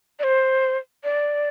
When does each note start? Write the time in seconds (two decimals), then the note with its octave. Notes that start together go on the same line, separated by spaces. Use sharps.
0.19 D5
0.23 C5
1.04 D5